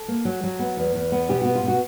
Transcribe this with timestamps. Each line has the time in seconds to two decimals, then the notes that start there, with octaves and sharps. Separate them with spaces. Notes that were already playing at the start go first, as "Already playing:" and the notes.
Already playing: A4
0.08 A#3
0.25 F#3
0.43 F#3
0.59 B3
0.77 E2
0.95 E2
1.12 B3
1.29 B2 G4
1.42 B3 F#4
1.55 F4
1.63 B2 F#4